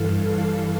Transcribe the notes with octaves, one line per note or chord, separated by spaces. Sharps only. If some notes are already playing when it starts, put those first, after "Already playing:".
Already playing: G2 E3 A4 F5
A4